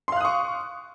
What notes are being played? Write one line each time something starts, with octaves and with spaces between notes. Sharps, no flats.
F5 C6 C#6 D#6 F#6